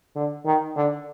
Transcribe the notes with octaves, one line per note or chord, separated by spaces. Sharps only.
D3
D#3
D3